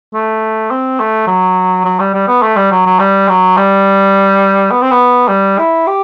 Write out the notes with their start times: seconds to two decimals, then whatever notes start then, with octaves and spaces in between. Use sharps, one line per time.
0.13 A3
0.71 C4
1.00 A3
1.27 F#3
1.85 F#3
2.00 G3
2.14 G3
2.27 B3
2.42 A3
2.56 G3
2.71 F#3
2.86 F#3
2.99 G3
3.29 F#3
3.57 G3
4.71 B3
4.81 C4
4.91 B3
5.28 G3
5.58 E4
5.87 G4